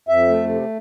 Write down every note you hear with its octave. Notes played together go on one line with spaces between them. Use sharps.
F2 E5
A3
C3